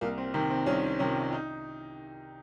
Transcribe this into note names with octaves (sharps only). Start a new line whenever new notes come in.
C2 A#3
C4
C3 D#3 C4
C4
C2 C#4
C3 D#3 C#4
D#4